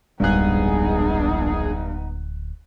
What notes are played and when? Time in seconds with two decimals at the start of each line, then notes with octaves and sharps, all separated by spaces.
0.20 D1 A#1 G2 G#3 B3 D#4 G#4 F#6